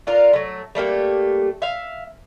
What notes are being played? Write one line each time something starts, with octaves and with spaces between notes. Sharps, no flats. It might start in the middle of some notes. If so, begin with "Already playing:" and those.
D4 F4 A#4
F#3 A3
G3 A3 A#3 G4
E5 F5